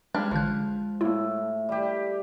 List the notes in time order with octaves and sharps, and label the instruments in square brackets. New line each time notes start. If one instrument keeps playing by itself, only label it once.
[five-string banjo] G3 D4 C#5 [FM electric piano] G#3 [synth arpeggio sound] F6
[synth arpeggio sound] A1 D3 F#6 [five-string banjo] F3
[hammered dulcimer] A2 [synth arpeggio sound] A#3 E4
[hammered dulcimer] G3 G4